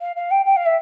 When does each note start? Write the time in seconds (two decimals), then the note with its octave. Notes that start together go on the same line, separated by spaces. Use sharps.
0.01 F5
0.16 F5
0.31 G5
0.45 G5
0.56 F5
0.65 E5